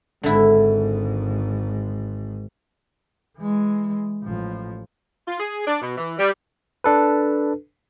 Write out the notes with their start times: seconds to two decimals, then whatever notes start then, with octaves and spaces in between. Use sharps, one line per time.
0.23 G#1 G#2 D3 E4
3.38 E3 G#3
4.24 A1 F3
5.28 F4
5.40 G#4
5.67 D4
5.82 B2
5.97 E3
6.19 G3
6.84 D4 A4 B4